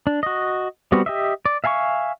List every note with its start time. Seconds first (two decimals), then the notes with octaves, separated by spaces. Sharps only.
0.07 D4
0.23 F#4 D#5
0.92 G3 B3 C4 F#4
1.06 G4 D#5 E5
1.46 D5
1.64 E5 F5 G#5 A5 C#6